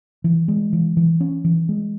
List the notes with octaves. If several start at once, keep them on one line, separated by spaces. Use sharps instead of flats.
E3
G#3
E3
E3
C#4
E3
G#3